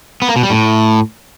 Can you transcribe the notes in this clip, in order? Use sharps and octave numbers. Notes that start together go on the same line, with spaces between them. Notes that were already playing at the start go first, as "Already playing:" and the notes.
B3
A#3
B2
G3
A2